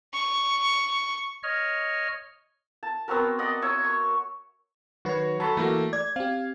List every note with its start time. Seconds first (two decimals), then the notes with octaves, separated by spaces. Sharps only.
0.14 C#6
1.43 C#5 D#5 F6
2.83 A5
3.08 B3 C4 F#4 A#4
3.39 D5 D#5 F#5
3.62 C#5 E5
3.84 C#6
5.05 D#3 F#3 F#4 B4 C#5
5.40 F#3 A4 A5 B5 C#6
5.57 E3 A3 A#3 E4 F#4
5.93 D5 G#6
6.16 C4 G4 F5